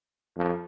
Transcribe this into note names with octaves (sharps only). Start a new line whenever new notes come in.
F2